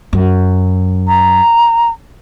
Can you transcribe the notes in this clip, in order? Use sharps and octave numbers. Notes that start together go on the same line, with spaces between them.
F#2
A#5